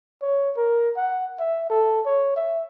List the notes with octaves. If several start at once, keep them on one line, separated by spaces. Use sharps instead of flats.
C#5
A#4
F#5
E5
A4
C#5
E5